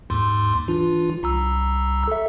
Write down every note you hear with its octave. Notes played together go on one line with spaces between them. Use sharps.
D#2 G#2 C6
E3 D4 F4
C2 A#5 E6
A4 E5